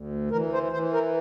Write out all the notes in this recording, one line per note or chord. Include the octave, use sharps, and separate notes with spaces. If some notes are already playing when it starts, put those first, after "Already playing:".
Already playing: D2
E3 A#4
C5
E3 C5
A#4